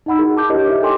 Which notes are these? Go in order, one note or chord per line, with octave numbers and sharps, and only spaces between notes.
D#4 D#5 F#5 B5 E6
D#4 E4 F#4 G#4 A#4
A5 D6 G6
D4 E4 G4 A#4 C#5 D#5
E4 C5 D#5 E5
G4 A4 G5 G#5 C6 D6